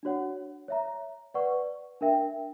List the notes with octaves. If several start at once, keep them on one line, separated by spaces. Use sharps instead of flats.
D4 F#4 C#5 F#5
C#5 E5 A#5
B4 D5 F#5 C#6
D4 A#4 E5 G5